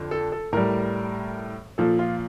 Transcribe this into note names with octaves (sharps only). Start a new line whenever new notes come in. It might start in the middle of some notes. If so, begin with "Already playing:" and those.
Already playing: F2 D3
A4
A4
A2 G3 A#4
A#2 F3 A4
F4